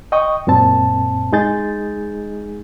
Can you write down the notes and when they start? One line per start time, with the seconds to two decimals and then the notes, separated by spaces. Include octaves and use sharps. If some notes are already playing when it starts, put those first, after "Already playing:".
0.12 D#5 G5 C#6 D#6
0.47 F#2 A#2 C4 A5
1.33 G#3 D#4 G#4 G6 A6